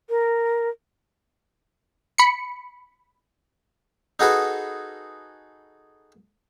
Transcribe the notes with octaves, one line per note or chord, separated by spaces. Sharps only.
A#4
B5 C#7
D#4 F#4 G#4 A4 B4